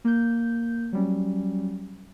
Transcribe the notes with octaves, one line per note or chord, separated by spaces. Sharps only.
A#3 G6
F#3 G3 C#4